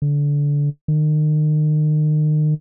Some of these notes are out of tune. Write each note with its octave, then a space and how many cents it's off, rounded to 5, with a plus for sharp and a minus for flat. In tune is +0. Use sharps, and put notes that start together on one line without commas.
D3 -20
D#3 -35